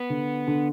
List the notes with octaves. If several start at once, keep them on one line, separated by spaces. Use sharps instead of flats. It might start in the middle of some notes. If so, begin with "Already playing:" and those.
Already playing: B3
D3
D3